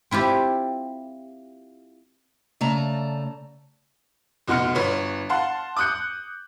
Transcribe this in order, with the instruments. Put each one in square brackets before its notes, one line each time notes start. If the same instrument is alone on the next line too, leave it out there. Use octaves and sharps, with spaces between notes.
[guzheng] C4 E4 F4 G4
[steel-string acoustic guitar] C#3 A3 D5 A5 A#5
[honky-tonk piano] F1 B2 F#5 C6 F6 C#7
G1 B4 C#5
F5 F#5 A5 C6
D6 D#6 F#6 G6 C#7